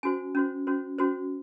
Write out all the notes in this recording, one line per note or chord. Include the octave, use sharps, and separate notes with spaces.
C#4 F#4 C5 G#5
C#4 F#4 C5
C#4 F#4 C5
C#4 F#4 C5